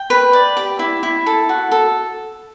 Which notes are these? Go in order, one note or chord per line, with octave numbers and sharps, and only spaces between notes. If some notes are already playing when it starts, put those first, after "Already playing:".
Already playing: G5
B4
D5
G4
E4
E4
A4
F#4
A4